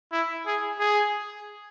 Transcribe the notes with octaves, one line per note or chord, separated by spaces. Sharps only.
E4
G#4
G#4